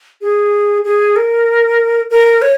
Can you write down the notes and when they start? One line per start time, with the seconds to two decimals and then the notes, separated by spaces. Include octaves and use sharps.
0.22 G#4
0.84 G#4
1.16 A#4
2.10 A#4
2.42 C#5